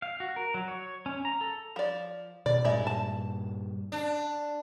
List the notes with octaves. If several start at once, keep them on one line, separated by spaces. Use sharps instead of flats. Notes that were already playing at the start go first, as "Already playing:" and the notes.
F5
F#4
A#4
F#3
C#5
C#4
A#5
A4
F3 D5
B2 D#3 D5
G2 A#2 G#3 D5 E5
A5
D4